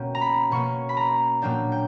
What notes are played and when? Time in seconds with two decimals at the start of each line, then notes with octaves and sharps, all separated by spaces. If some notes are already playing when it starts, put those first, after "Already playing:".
Already playing: B2 A#3 C#4 G5
0.15 A#5
0.21 B5
0.51 B2 A#3 C#4 C#6
0.89 B5
0.97 A#5
1.42 A#2 F#3 A#3 D4 G5
1.72 G5